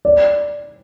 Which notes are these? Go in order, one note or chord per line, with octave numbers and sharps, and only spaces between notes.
D5